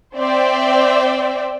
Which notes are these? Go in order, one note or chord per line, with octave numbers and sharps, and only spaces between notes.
C4 C5 D5 E5 G5